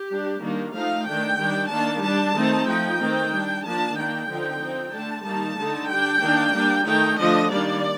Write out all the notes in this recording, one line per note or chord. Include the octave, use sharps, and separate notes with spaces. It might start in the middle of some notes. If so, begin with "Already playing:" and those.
Already playing: G4
G3 D4
D#3 G3 A#3 D4
F3 A3 D#4 F5
D#3 A3 D4 G5
D#3 G3 D4
D#3 A#3 D4 A5
G3 D4 A5
D#3 A3 C4 D#4
F3 A3 D#4 G5
D#3 A3 C4
G3 D4
F3 A#3 D4 A5
D#3 A#3 D4 G5
D3 F3 C4 D#4
F3 C4 D#4
D3 A3 D4 A5
D#3 G3 A#3 D#4 A5
D3 A3 D#4
G3 D4 G5
D#3 A#3 D4
G3 A#3 D4
D#3 A3 D#4 G5
D3 F3 A3 D4 D#5
D#3 G3 A#3 D4 D5